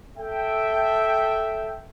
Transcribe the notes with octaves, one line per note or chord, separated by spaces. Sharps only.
A4 E5 G5